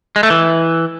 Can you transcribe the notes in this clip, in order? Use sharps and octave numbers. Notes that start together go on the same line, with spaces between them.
G#3
A3
E3